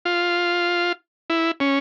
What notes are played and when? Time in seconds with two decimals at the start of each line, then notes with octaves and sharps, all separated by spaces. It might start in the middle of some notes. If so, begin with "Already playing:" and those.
0.05 F4
1.30 E4
1.60 C#4